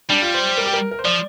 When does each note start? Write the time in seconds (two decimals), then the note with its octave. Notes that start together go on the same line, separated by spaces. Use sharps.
0.10 G3 D4
0.22 F4
0.34 C5
0.47 C5
0.58 A#4
0.66 G4
0.73 A#4
0.91 A#4
0.99 C5
1.05 F3 D5